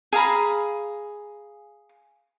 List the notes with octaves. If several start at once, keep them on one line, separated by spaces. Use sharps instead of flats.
G#4 F5 A#5 B5